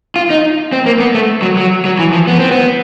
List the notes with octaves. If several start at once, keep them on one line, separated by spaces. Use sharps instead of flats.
F4
D#4
C4
A#3
B3
A3
F#3
F#3
F#3
E3
F3
B3
C4
B3